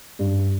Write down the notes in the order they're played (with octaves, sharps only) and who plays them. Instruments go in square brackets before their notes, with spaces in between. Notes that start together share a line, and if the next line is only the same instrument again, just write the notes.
[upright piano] G2